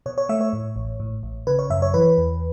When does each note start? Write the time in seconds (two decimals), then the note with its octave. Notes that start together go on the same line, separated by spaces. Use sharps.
0.06 B2 C#5
0.18 C#5
0.29 A3 E5
0.41 C#5
0.53 A2
0.76 A1
1.00 A2
1.23 A1
1.47 C#3 B4
1.59 C#5
1.70 F#2 E5
1.82 C#5
1.94 E3 B4
2.17 E2